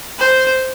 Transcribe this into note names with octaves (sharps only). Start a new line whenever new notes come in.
C5